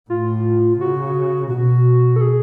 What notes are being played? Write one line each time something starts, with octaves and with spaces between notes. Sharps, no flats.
A2 F4
C#3 F#4
B2 F#4
A4
G#4